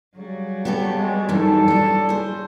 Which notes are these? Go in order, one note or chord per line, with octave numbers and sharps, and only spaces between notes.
C#3 F#3 G3
B3 G4 A4
G#3
F#2 D#3 E3 A4
D4 E4
G#4 C5